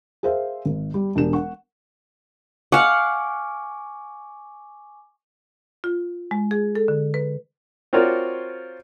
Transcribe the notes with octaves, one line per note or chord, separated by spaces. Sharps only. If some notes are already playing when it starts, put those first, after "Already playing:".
G#4 A#4 C5 E5 F5
G#1
G3
E1 D4 G4 E7
F#5 C#6
F5 F#5 G#5 C#6 D6
F4
G#3
G#4
A4
D3
B4
C4 F4 F#4 A#4 C#5 D5